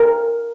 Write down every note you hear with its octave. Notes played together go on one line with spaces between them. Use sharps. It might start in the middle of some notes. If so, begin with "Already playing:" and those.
Already playing: A#4